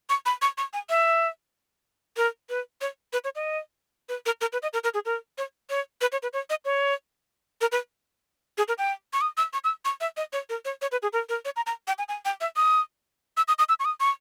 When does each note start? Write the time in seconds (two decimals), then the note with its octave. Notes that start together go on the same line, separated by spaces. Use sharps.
0.09 C#6
0.26 B5
0.42 C#6
0.58 C#6
0.73 G#5
0.89 E5
2.17 A#4
2.49 B4
2.81 C#5
3.13 B4
3.24 C#5
3.35 D#5
4.09 B4
4.26 A#4
4.41 A#4
4.53 B4
4.63 D#5
4.73 A#4
4.84 A#4
4.94 G#4
5.05 A#4
5.38 C#5
5.70 C#5
6.01 B4
6.12 C#5
6.23 B4
6.33 C#5
6.50 D#5
6.65 C#5
7.61 A#4
7.72 B4
8.58 G#4
8.68 A#4
8.78 G5
9.13 C#6
9.21 D#6
9.37 E6
9.53 C#6
9.64 E6
9.85 C#6
10.01 E5
10.17 D#5
10.33 C#5
10.49 A#4
10.65 C#5
10.82 C#5
10.92 B4
11.03 G#4
11.13 A#4
11.29 A#4
11.45 C#5
11.56 A#5
11.67 A#5
11.88 G5
11.98 G#5
12.09 G#5
12.25 G5
12.41 E5
12.56 D#6
13.37 E6
13.48 D#6
13.59 D#6
13.69 E6
13.80 C#6
13.85 D#6
14.00 C#6